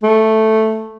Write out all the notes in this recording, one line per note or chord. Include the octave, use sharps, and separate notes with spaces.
A3